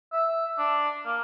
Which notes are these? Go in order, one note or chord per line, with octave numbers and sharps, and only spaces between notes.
E5
D4
A#3